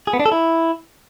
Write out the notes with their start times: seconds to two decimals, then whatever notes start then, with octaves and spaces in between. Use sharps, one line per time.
0.07 G#4
0.13 B3
0.20 D4
0.26 A4
0.32 E4